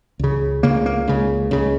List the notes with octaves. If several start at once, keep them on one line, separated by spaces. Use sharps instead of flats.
C#2 C#3
C#2 C#3 A#3
A#3
C#2 C#3
C#2 C#3